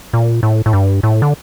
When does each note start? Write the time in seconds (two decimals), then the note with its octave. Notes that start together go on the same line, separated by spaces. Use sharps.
0.13 A#2
0.43 A2
0.66 A2
0.73 G2
1.03 A2
1.22 D3